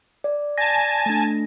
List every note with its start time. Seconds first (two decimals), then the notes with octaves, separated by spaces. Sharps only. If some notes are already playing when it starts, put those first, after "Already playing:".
0.24 D5
0.58 G#5 A5 A#6
1.06 A3 D4